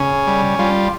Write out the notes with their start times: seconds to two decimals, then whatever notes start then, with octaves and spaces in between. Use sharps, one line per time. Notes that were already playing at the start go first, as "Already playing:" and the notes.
Already playing: C#3 C#4
0.27 G3
0.59 G3 F4